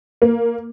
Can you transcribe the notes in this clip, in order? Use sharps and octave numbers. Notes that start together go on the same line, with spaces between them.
A#3